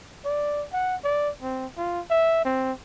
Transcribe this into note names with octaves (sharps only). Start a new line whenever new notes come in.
D5
F#5
D5
C4
F4
E5
C4